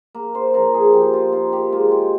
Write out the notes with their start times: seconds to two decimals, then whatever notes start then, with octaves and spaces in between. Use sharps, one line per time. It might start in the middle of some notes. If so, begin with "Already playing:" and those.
0.15 A#3
0.35 C5
0.54 F3 A#4
0.74 G#4
0.93 F3 G4
1.13 F4
1.33 D#4 F4
1.53 G4
1.72 G#3 F4
1.91 G4